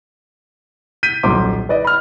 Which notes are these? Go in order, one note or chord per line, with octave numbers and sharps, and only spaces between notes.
G6 B6 D#7
D#1 B1 C5 D6
B4 D5 D#5
B5 F6